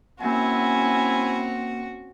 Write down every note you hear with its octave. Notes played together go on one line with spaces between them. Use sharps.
A#3 C4 C#4 E4 F#4 F#5 G#5